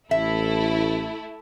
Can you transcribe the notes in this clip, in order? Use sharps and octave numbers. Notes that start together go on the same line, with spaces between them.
A1 A3 E4 E5